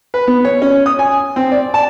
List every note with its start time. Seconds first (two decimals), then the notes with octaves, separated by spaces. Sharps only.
0.14 B4
0.27 B3
0.45 C#5
0.62 C#4
0.86 D#6
0.99 G#5
1.36 C4
1.52 D5
1.74 A5